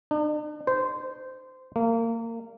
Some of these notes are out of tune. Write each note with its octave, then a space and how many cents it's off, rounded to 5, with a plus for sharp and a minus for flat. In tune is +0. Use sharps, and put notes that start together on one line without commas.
D4 +45
C5 -20
A#3 -25